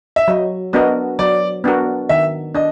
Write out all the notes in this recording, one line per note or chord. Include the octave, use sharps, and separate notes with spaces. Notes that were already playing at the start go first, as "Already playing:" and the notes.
E5
F#3 D#5
B3 D4 F#4 A#4 D#5
F#3 D5
B3 D4 F#4 A#4
D#3 E5
D4 D#5